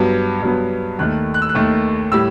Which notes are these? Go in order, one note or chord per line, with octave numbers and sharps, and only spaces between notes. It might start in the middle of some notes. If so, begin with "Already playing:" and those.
Already playing: G2 F#3 B3
G2 F#3 B3
D#2 D#3 A3 F#6
F#6
E6
F#6
D#2 D#3 A3
A2 G3 E6